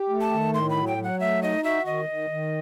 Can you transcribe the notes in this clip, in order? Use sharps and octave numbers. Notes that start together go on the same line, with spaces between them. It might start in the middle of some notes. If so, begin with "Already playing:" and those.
Already playing: G4
A3
A5
D#3
A2 C6
B5
F#3
G5
F#3
F#5
A3 E5
D#4 D#5
F#4 E5
D#3 D#5
D#3
D#3